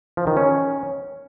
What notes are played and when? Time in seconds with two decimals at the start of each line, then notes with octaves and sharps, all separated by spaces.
0.17 F3
0.27 D#3
0.37 C#4